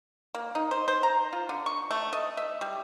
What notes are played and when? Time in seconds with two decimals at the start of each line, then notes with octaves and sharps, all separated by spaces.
0.35 A#3
0.55 D#4
0.71 C5
0.88 C5
1.03 A#5
1.33 F4
1.49 D3
1.66 C#6
1.91 A3
2.13 D#5
2.37 E5
2.61 G3